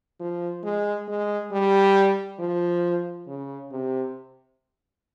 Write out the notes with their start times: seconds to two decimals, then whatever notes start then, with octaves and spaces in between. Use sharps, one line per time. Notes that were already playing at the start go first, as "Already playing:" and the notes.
0.20 F3
0.64 G#3
1.08 G#3
1.52 G3
2.39 F3
3.27 C#3
3.71 C3